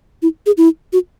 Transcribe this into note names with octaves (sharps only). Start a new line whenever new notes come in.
E4
G#4
E4
F#4